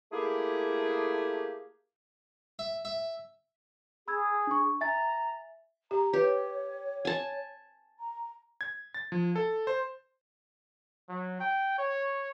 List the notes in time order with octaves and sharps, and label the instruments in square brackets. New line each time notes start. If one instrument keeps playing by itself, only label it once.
[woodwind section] A3 A#3 E4 G4 G#4
[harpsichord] E5
E5
[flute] G#4 [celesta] B5 E6 G#6
[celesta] D4 C#6
[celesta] E5 G#5 A6 [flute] A#5
[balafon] G4 [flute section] A#5
[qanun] G4 [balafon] B4 [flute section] C#5
[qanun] G#5 A5
[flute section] A#5
[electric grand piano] G#6
A6
F3
A4
C5
[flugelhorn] F#3
G5
C#5